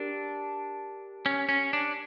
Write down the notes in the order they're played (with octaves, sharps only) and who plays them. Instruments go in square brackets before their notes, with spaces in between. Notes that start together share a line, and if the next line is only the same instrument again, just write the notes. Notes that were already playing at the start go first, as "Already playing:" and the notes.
Already playing: [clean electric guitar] D4 [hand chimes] G4 A#4
[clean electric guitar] C#4
C#4
D4